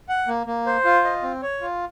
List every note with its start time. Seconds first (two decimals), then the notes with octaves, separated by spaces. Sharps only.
0.09 F#5
0.27 A#3
0.47 A#3
0.66 C5
0.85 F4
1.05 D#5
1.22 C4
1.42 C#5
1.61 F4